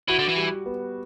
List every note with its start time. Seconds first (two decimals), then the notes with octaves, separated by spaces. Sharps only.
0.08 E3 F#4
0.19 D3
0.28 E3
0.36 G3
0.66 B3